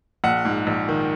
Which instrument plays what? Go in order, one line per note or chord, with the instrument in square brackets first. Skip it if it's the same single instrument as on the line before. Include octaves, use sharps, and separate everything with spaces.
[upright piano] A#1 F#5
G#2
A#1
D#3